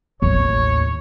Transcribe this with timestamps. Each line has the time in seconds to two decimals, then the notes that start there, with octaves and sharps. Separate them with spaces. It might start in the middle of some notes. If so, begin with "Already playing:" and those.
0.22 A1 D#2 C#5